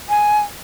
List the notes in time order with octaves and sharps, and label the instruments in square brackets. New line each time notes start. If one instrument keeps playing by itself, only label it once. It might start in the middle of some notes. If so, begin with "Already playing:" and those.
[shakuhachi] G#5